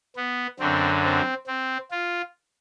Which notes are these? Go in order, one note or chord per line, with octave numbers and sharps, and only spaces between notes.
B3
F#2 D3 F#3 C4
C4
C4
F4